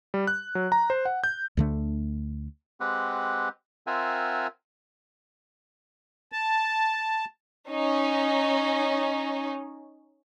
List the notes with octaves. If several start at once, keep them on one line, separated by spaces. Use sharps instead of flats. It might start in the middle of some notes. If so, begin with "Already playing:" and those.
G3
F#6
F#3
A#5
C5
F#5
G6
D2 D3 A3
G#3 C4 G4 B4 F#5
C4 F4 A#4 E5 F#5 G#5
A5
C#4 D#4